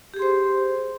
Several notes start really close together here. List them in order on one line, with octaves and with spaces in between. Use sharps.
G4 G#4 C6 C5